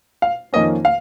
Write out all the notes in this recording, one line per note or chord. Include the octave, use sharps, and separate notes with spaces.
F5
F2 D#3 A#3 C#4 D#5
F5